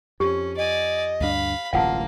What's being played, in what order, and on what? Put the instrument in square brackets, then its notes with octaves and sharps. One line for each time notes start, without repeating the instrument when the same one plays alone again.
[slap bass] F2 [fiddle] C#4 [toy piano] G4
[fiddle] D5 G#5 [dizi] D#5
[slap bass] D2 G2 D4 [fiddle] F5 B5
[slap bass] D1 A1 G2 [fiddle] A#3 [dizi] F4 [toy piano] F5 F#5 A5